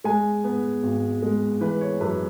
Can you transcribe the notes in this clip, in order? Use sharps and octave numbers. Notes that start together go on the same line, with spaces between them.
G#3 G#5
B3
G#1
G#3
E3 B4
C#5
F#2 B4